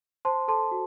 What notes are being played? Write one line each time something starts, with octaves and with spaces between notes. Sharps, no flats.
C5 A5 C6
A4 A5 C6
F#4